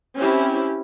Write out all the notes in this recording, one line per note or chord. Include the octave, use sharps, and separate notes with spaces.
C4 C#4 E4 G4